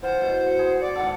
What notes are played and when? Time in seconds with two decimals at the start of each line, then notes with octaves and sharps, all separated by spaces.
0.03 E3 F4 C5 F#5
0.21 B2 F#3
0.43 F#5
0.58 E4 G#4 C6
0.81 D5
0.96 G#2 D#3 A4 F#5